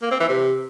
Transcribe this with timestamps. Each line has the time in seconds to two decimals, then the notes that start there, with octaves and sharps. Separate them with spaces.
0.02 A#3
0.11 C4
0.20 E3
0.29 C3